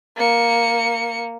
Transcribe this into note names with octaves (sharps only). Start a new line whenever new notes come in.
A#3 C#7